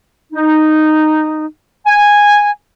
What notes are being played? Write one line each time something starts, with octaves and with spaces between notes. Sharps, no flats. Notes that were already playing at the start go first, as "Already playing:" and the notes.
D#4
G#5